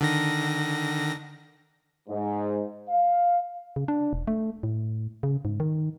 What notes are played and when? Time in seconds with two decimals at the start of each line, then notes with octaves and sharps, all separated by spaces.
0.01 D3 D#3 A#6
2.08 G#2
2.89 F5
3.76 C#3
3.88 D4
4.13 E1
4.27 A3
4.63 A2
5.23 C#3
5.45 G#2
5.60 D#3